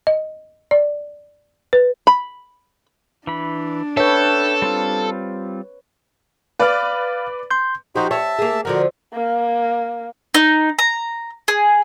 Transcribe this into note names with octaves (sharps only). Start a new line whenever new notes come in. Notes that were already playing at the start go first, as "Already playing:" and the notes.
D#5
D5
B4
B5
E3 D4 B5
A4 B4 C#5 E5 G5
G3 C4 F4
B4 D5 F5 F6
C6 G6
F3 D#4 F#4 G4 C5
C#5 E5 A5
A#3 G#4
D3 F3 F#4 A#4
A#3
D#4
A#5
G#4